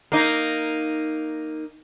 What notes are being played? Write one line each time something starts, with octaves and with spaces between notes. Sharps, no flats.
A#3 D#4